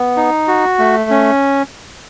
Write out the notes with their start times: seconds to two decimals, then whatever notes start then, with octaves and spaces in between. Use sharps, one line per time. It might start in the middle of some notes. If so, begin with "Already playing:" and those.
Already playing: B3
0.17 D#4
0.48 F#4
0.79 A3
1.10 C#4